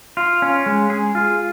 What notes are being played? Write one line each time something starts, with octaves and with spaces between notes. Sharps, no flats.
F4
C#4
G#3
G#4
F4